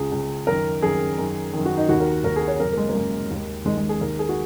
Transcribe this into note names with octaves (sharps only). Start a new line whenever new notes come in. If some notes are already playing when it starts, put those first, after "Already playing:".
Already playing: C#2 C#3 G#4
C#2 C#3
F#2 D#3 A#4
F#2 D#3 G#4
F#2 D#3
F#2 D#3
F#4
D#4
D#2 D#3 F#4
A#4
D#2 D#3 A#4
G#4
C#5
F#2 C#3 A#4
A#3
G#3
A#3
F#2 C#3 G#3
D#2 D#3
D#2 D#3 G#3
G#3
G#4
D#2 D#3 A#4
G#4
F#4